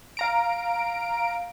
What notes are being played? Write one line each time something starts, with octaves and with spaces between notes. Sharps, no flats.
F5 A#5 D7